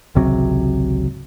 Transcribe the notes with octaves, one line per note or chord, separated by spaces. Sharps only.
G#1 C#2 C3 F#3